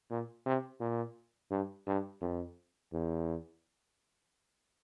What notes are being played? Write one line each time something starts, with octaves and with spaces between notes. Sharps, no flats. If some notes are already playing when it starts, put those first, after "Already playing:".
A#2
C3
A#2
G2
G2
F2
E2